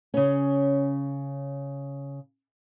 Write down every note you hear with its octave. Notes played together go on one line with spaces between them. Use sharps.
C#3 C#4